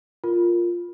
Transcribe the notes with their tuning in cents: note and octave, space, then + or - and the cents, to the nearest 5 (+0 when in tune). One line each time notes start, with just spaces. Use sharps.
F4 +0 A#4 +0